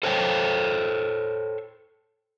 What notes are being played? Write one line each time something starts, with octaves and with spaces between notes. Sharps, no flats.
A4 C5 C#5 G5